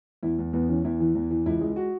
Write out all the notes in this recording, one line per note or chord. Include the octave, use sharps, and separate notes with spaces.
E2 E4
E2
E2 B3
E3 C#4
E2 E4
E3
E2
E3
C#2 E4
G#3
F#4